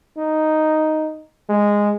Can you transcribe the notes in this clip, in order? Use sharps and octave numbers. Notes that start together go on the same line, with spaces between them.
D#4
G#3